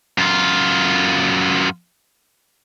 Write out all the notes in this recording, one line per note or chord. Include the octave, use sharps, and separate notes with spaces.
F#2 F4